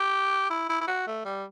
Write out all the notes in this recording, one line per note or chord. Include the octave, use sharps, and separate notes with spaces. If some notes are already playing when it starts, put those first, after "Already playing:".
Already playing: G4
E4
E4
E4
F#4
A3
G3